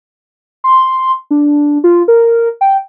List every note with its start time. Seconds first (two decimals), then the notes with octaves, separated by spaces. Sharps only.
0.64 C6
1.31 D4
1.84 F4
2.08 A#4
2.61 G5